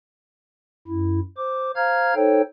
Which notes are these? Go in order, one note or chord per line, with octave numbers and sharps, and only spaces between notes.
F#2 E4
C5 D6
C5 F5 A#5 F6 G#6
D#4 A4 C5 C#5 G5